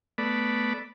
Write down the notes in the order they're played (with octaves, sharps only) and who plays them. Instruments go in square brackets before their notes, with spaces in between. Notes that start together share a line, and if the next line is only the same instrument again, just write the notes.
[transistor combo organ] A3 B3 D5 B5